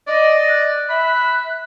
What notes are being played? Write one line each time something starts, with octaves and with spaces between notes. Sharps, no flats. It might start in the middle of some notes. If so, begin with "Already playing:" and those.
D5 D#5
F#6
E5 B5